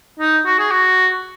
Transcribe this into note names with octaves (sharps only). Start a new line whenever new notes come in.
D#4
F#4
G#4
F#4